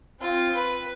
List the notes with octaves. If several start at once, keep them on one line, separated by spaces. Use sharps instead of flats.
C4 F4
B4